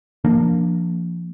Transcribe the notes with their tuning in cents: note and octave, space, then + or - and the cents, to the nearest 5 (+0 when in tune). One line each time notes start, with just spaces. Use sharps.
F3 -20 A#3 +0 D4 +0